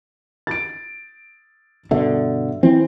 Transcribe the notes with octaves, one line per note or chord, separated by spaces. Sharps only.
A6 D7
G2 B2 D3 E5
E3 C4